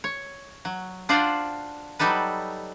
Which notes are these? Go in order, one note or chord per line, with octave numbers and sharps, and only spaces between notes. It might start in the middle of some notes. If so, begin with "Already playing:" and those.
C#5
F#3
D4 F4 F#4 C5 D5
F#3 G3 D#4 A4 B4